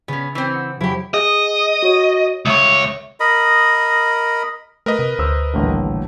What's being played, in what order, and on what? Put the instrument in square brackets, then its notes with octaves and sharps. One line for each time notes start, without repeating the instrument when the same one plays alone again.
[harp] C#3 [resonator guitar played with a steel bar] B3 C#4
[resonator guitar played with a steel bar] E3 C4
[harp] F#5 D#6 C#7
[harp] F2 C#3 F#3 [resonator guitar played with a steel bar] E4 G4
[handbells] G#4 [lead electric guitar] D#5
[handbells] F#4 C#5
[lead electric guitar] C#2 C#5 [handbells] E5 C#7
[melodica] A#4 D#5 B5
[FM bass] A3 [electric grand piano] A#4 B4 D#5
[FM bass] C3
[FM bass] D2 [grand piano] C5 E6
[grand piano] D#1 A1 D3